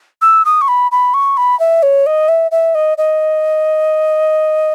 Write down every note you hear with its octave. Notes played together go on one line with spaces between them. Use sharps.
E6
D#6
C#6
B5
B5
C#6
B5
E5
C#5
D#5
E5
E5
D#5
D#5